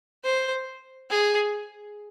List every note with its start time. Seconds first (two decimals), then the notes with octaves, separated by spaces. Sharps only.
0.24 C5
1.10 G#4